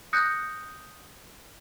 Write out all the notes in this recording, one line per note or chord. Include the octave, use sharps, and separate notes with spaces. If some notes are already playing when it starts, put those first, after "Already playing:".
D#6 F#6 G6 A#6 C#7